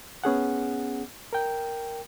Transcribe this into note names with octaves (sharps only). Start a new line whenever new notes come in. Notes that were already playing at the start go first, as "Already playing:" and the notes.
B3 C#4 G#4 F#5
A#4 G5